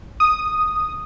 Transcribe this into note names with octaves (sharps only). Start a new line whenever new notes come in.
D#6